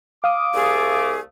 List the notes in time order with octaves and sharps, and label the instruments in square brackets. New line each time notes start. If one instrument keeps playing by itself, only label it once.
[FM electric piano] F5 D#6 [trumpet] D6
[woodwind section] C2 A3 [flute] G#4